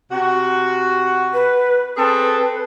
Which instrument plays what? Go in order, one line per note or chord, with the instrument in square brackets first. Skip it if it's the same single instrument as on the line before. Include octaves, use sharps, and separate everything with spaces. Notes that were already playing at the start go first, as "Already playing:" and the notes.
[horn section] C3 F#4
[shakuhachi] B4
[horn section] C4 G#4 A4 [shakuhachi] B4